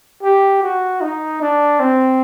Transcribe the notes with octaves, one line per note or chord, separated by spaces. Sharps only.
G4
F#4
D#4
D4
C4